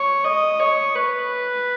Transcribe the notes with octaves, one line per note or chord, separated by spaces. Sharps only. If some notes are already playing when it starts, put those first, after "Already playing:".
Already playing: C#5
D#5
C#5
B4